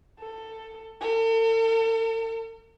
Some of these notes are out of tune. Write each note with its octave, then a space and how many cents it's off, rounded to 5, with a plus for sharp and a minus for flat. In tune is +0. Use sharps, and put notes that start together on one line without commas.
A4 +15
A4 +45